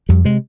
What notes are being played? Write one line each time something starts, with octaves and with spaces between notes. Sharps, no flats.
F2 G3
C3 G#3